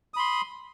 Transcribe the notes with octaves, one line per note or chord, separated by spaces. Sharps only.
B5 C6 D#6